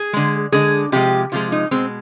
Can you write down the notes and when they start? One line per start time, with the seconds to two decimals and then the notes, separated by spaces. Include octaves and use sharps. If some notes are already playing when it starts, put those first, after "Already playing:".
Already playing: G#4
0.13 D3 G#3
0.52 D3 G#3 G#4
0.92 C3 F3 G#3 G4
1.32 C3 F3 G#3 F4
1.52 D#4
1.71 B2 G#3 C4